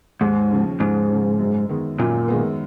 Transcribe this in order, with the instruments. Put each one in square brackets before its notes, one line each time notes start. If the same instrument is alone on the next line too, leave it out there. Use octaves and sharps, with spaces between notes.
[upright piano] D#2 [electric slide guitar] G#2
[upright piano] C#3 F3
[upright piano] D#2 [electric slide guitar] G#2
[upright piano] C#3 F3
F#2
D#3 G#3 B3
[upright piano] F#2 [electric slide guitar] A#2
[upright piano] D#3 G#3 B3